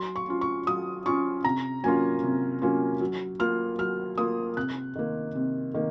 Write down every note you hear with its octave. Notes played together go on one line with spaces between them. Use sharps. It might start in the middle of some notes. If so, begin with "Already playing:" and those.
Already playing: F#3 C6
C#6
C#4 F4
C#6
F#3 D#6
C#4 F4 C#6
C3 A#5
F#3 A#3 C#4 F4 G#5
C3
F#3 A#3 C#4 F4
F#3
A#3 F4 F6
F#3 F6
A#3 F4 D#6
C3 F#6
D#3 A#3
C3
D#3 A#3